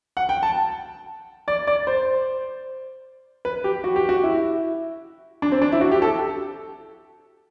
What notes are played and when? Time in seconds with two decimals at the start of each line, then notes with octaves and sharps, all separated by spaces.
0.17 F#5
0.29 G5
0.43 A5
1.48 D5
1.67 D5
1.87 C5
3.45 B4
3.64 G4
3.84 F#4
3.96 G4
4.09 F#4
4.24 E4
5.42 D4
5.52 C4
5.62 D4
5.72 E4
5.81 F#4
5.91 G4
6.02 A4